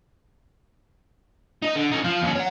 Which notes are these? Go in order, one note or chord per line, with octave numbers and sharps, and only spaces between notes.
D#4 D#5
D3
C#4 D#4
F3 F4
D#2 C#4
C#5 F#5